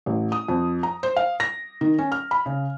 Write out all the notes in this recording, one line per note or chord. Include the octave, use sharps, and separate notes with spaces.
A1
D#6
F2
A#5
C5
F5
A#6
D#3
C#4
F6
B5
C#3